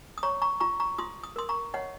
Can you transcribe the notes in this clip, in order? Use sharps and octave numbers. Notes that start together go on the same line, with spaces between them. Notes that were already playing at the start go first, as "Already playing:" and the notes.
D#6
C#5 A#5 C#6
A#5 C#6
F4 A#5 C#6
A#5 C#6
F4 C6 D#6
D#6
A#4 C6 D#6
A#5 C#6
C#5 D#5 F#5